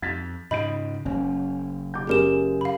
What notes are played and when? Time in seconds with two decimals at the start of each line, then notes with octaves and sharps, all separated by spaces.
0.02 F2 G#6 A6 B6
0.51 G#2 C#3 D#5 B5 G6 D7
1.05 F#1 C#4
1.94 D6 G6
2.07 F#2 G4 G#4 A#4 E7
2.61 F5 B5